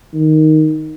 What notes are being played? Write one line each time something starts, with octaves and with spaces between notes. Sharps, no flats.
D#3